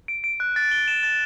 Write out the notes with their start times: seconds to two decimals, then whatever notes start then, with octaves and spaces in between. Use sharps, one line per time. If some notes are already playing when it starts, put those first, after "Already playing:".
0.08 D7
0.24 D7
0.40 F#6
0.56 A6
0.71 G7
0.88 E7
1.03 A6